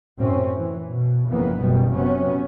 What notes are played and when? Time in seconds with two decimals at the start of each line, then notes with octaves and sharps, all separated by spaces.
0.18 F#2 A2 C3 C4 C#4
0.53 A2 E3
0.89 B2
1.27 G1 F2 C#3 E3 A#3 B3
1.59 F#1 F#2 B2 D#3 G3
1.94 C3 F#3 B3 C#4